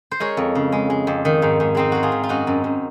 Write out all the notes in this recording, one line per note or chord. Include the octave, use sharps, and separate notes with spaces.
C5
G#3 A#4 C#5
F2
C#3
G#3
G#3
F2
D#3
G#2
G#2
G#3 C4 D#4
G#2 F#4
F4 G#4
G#2
F4
F#2 D#4 F#4
F#2
F#2